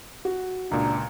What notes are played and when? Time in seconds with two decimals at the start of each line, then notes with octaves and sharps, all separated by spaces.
0.25 F#4
0.71 C#2 A#2 D4 A#5